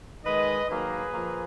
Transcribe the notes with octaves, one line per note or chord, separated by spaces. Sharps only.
D#3 G#3 B4 D#5
D#3 F#3 A#3 G#4 B4
A#2 F3 A#3